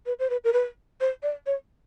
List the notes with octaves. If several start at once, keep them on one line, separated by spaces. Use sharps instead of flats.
B4
C5
B4
A#4
B4
C5
D5
C#5